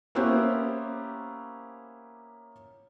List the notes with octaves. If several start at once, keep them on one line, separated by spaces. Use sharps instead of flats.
A#3 B3 C#4 E4 G4 C5